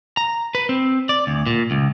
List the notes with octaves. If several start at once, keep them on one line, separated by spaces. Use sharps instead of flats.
A#5
B4
C4
D5
D2
A#2
C#2